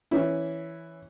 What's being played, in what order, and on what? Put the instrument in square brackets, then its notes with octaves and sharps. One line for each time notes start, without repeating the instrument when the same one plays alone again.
[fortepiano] E3 C#4 E4